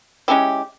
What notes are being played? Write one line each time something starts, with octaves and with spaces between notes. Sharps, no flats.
G#3 C#4 E4 G4